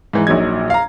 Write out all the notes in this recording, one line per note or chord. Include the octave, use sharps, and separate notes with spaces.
G#2 E3
A#1 A#2 F#3 D#4 G#6
F5 A#5